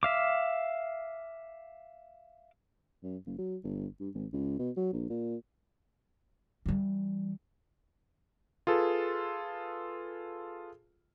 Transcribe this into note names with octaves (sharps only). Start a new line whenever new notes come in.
E5 F5 D6
F#2
F#1
F#3
G1
G2
G#1
C#2
B2
F#3
A#1
A#2
E3 G3
F4 G#4 A4 B4